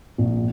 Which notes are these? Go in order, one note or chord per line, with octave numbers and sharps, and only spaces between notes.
A#1